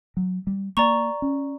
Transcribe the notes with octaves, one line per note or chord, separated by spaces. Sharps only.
F#3
G3
A#3 D5 A#5 C#6
C#4